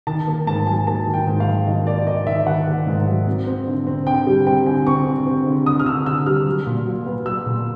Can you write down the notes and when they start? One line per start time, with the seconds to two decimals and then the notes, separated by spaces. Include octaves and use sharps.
0.07 D#3 A5
0.27 A#3
0.47 G#2 A5
0.67 F#3 G#5
0.87 A#3 A5
1.07 D#3
1.14 G5
1.27 G#2
1.40 F5
1.47 F#3
1.67 D#3 D#5
1.87 A#3 D5
2.07 A#3 D#5
2.27 D#3 E5
2.47 D#3 F#5
2.67 A#3
2.87 G#2
3.07 F#3
3.27 C4
3.47 C4
3.66 D3
3.87 C4
4.06 D3 G5
4.27 G3
4.46 C4 G5
4.66 D3 G#5
4.86 C4 C#6
5.07 D3
5.26 C4
5.46 D3
5.66 D3 D#6
5.80 F6
5.86 D3 E6
6.06 D3 E6
6.26 G3 F6
6.46 F#3
6.66 A#2
6.86 F#3
7.06 B3
7.26 F#3 E6
7.46 A#2